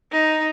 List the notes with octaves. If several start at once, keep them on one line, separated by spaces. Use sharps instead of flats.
D#4